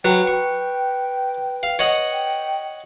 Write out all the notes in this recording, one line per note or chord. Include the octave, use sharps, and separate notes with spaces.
F#3 B4 G5
G5 C#6
F5
C#5 D#5 F#5
G5